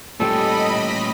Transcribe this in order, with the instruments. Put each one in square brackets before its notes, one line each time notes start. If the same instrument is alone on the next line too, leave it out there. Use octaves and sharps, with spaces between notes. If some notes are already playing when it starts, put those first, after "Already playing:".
[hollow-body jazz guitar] A#2 G3 G4 [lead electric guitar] A3 C#4 [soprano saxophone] A4 [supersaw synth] D#5 B5